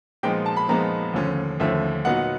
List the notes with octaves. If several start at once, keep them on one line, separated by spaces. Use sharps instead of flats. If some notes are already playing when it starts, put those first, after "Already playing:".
A#2 F3 G#3 B3 D#4 G5
A5
B5
A#2 F3 G#3 B3 D#4 A#5
D#2 D3 F3 A3 C#4
D#2 D3 F3 A3 C#4 E5
A#2 F#3 B3 D#4 F#5